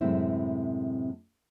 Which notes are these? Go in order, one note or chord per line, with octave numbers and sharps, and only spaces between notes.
F#2 A2 C3 G#3 C4 E4